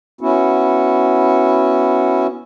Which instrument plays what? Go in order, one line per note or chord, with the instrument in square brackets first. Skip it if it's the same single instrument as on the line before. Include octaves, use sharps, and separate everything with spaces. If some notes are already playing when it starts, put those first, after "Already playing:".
[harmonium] B3 C#4 E4 F#4